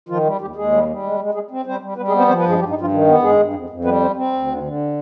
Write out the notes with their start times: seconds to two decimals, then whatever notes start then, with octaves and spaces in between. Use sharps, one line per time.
0.09 D#3 F3 F4
0.24 G3
0.41 D#2 G3 G4
0.56 D#2 G#3 G#4
0.72 G3
0.88 G3
1.03 G#3
1.19 G#3
1.34 G#3 G#4
1.51 C4
1.65 G3 C4 C5
1.81 G3
1.97 G3 B3 B4
2.08 G#3 G#4
2.12 B3
2.18 C4 C5
2.28 F3 C4 C5
2.38 B3 B4
2.44 G2
2.49 G#3 G#4
2.59 G2 G3 G4
2.70 D#4
2.76 G2
2.81 F3 F4
2.92 D#3
3.07 B3
3.22 G2 G#3 G#4
3.39 G2
3.53 F2
3.70 F2
3.85 G3 B3 B4
4.00 C4 C5
4.17 C4
4.32 D2
4.47 D3
4.63 D3